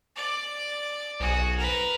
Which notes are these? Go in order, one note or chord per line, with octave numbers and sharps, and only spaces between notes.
D5
B1 F#4 G#4
A#4 B4